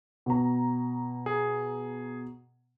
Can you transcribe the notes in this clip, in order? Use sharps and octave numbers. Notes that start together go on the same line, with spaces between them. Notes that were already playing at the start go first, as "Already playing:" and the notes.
B2 A#5
G#4